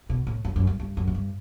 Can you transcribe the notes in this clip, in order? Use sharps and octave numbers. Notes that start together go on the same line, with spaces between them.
B2
A2
F#2
F#2
G2
G2
F#2
A2
G2